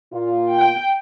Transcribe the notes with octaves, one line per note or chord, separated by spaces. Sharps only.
A#2 F4
G5